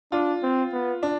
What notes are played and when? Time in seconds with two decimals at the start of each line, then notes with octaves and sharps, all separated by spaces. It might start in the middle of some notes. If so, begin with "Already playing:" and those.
0.12 D4 F4
0.43 C4
0.72 B3
1.03 D4